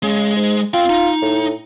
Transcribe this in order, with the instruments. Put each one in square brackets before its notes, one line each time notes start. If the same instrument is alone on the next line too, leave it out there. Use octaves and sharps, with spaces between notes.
[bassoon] C#3 [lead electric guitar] G#3
[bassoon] G#2
[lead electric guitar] C4 G5 [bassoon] F4
[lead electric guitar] D#4
[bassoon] A2